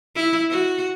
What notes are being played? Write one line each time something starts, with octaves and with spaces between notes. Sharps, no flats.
E4
F#4